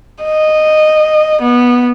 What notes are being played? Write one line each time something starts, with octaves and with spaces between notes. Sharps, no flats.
D#5
B3